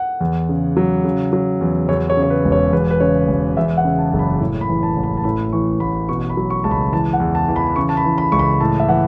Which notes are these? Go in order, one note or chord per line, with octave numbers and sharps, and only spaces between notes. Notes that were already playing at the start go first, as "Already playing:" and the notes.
Already playing: F#5
E2
C#3
F#3
C#3
F#3
E2
E2 C#5
C#5
C#3
C#5
B4
E1
C#5
E2 B4
B4
C#3 C#5
E1
E2 E5
F#5
C#3
A5
F#1 A5
B5
A2
B5
E3
A5
A1
B5
A5
A2 B5
E3 C#6
A1 B5
B2 C#6
B5
F#3
C#6
C#2 A5
B5
E3 A5
F#5
E2
A5
E3
B5
C#3 C#6
A5
B5
E3
B5
C#2 C#6
B5
A2 A5
E5
E3 F#5